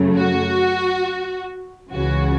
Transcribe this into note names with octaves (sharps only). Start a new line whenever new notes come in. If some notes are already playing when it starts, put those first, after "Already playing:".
Already playing: F#2 C#3 F#3 A3
F#4
C#2 C#3 E3 F#4